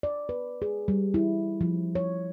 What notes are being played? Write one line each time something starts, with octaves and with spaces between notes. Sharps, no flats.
D5
B4
G#4
G3
E4
F3
C#5